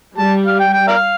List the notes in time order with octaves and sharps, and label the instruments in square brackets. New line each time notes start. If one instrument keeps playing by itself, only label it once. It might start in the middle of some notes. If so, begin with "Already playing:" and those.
[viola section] G3 [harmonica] A5
[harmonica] F5
G5
G5
A#4 D5 F5